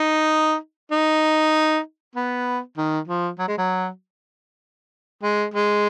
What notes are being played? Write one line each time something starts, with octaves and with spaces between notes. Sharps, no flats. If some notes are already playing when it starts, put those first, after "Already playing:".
Already playing: D#4
D#4
B3
D#3
F3
F#3
G#3
F#3
G#3
G#3